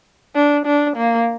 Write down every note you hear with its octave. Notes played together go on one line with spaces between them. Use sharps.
D4
D4
A#3